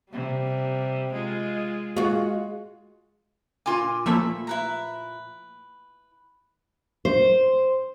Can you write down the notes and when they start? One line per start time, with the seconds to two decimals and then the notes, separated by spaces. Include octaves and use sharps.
0.12 C3 G3
1.13 G#3 F4
1.96 G#3 F4 F#4
3.66 A#2 F4 G#5 C6 D6
4.06 F3 A3 A#3 E5 B5
4.47 E4 B4 A#5
7.05 C5